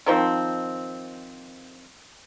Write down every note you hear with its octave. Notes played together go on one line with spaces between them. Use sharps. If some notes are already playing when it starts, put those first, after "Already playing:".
D#3 F3 C4